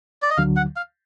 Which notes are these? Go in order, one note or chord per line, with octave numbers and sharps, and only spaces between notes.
D5
D#5
D2 D3 F#3 F5
F#5
F5